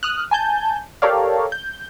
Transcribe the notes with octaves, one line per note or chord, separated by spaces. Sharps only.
D#6 F6 F#6
G#5 A5 G6
G4 A4 A#4 C#5 D5 F5
G6